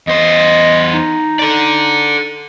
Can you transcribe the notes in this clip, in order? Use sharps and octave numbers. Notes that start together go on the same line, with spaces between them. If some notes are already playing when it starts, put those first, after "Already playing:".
E2 C5 D#5
D#4
A4 D5